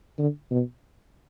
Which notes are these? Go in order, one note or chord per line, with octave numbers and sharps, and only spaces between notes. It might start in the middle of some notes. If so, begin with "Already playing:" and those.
D3
B2